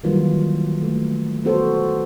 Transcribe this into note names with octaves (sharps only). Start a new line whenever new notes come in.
D#3 E3 F#3 G3 A#3 F4
A3
B3 F#4 A4 C5